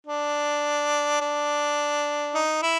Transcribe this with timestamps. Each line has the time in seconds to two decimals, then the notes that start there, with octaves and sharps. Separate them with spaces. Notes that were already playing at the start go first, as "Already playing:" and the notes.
0.07 D4
1.21 D4
2.35 D#4
2.62 E4